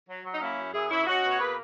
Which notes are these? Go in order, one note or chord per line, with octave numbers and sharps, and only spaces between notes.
F#3
F#3
D#4
A#3 C#4 E4
F#2
F#2 E4 G#4
F#2 C#4 E4
C#4 D#4 F#4
B2 C#5
A#3 G#4 B4